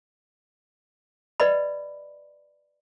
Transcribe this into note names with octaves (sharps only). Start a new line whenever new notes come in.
B4 D5 D#5 B5